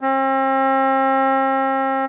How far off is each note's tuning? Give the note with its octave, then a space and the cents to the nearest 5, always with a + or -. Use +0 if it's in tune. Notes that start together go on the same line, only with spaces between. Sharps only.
C4 +40